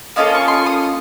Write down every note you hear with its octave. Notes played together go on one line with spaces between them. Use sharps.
A#3 C#4 F4 A4 D#5
C#6
C6
C#6
D#6